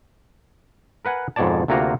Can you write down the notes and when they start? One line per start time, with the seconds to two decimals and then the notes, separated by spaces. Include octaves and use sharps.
1.05 A#4 B4 F#5 G#5
1.36 F2 G#2 B2 C#5 D5 A5
1.68 D2 C3 A#3 F4 F#4 A#5